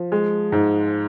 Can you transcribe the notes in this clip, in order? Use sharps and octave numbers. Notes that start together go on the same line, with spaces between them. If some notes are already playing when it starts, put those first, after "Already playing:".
Already playing: F3
G#3
G#2